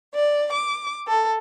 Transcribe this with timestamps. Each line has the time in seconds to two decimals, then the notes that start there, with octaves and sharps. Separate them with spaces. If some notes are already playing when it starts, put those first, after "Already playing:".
0.13 D5
0.52 D6
1.07 A4